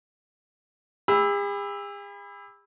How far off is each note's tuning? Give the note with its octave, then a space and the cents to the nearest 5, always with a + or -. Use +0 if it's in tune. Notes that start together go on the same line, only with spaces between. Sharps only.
G#4 -45 B5 +0 E6 +0